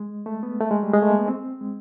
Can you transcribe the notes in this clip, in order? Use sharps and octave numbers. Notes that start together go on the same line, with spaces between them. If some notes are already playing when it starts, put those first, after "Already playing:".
Already playing: G#3
A3
B3
A3
G#3
G3
G#3
A3
A#3
B3
C4
G#3